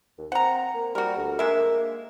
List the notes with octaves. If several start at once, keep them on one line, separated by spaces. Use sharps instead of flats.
D#2
C4 F#5 A#5
A#3
G3 F#4 A#4
D2
G#3 A#3 D4 E5